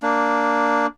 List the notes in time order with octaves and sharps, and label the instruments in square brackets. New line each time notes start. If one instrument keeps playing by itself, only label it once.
[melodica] A#3 D4